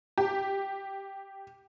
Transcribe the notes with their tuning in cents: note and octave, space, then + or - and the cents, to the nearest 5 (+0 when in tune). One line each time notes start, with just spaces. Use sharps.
G4 +0